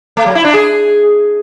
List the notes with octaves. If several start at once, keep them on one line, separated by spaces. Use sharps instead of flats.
A3
F#3
E4
D4
G#4